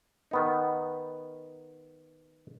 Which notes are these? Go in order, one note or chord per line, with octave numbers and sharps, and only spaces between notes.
D#3 B3 D#4